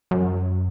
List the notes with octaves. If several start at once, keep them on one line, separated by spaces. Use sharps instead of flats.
F#2